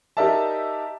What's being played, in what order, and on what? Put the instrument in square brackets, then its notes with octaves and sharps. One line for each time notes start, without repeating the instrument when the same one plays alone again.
[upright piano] D#4 G4 A#4 D5 E5 A5